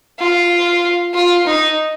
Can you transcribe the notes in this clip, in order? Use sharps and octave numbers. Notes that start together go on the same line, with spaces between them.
F4
F4
D#4